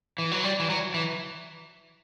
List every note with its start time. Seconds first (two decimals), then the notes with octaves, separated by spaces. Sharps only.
0.18 E3
0.31 F#3
0.44 G3
0.60 E3
0.70 F#3
0.94 E3